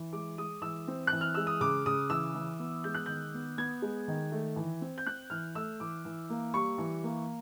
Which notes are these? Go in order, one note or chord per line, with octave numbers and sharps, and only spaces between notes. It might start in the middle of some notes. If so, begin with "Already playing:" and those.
Already playing: E3
G#3 D6
G#3 D#6
E3 E6
C4
E3 F#6
F6
G#3 E6
D#6
C#3 D6
C#3 D#6
E3 E6
E3
B3
G#3 G6
F#6
D#3 G6
B3
B3 G#6
G#3
D#3
A3
E3
C4
G6
C4 F#6
E3 F6
A3 E6
E3 D6
E3
A#3
G3 C#6
E3
A#3